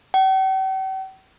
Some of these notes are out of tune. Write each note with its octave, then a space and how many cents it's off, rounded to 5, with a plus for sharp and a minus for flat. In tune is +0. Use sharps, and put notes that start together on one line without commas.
G5 -45